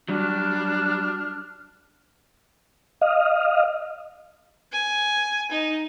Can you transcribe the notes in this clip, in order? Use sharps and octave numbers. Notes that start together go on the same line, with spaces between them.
F#3 G3 D4 F6 F#6
D#5 F5
G#5
D#4